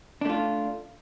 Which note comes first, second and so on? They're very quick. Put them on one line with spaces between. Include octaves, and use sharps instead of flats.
D4 A3 F4